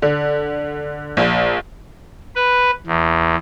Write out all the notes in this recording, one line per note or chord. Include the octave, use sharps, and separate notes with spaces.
D3
A#1
B4
E2